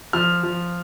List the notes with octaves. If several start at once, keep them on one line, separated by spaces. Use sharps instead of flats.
F3 F6
F3